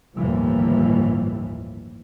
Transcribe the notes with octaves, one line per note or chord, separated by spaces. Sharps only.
G1 D#2 A2 E3 F3 G3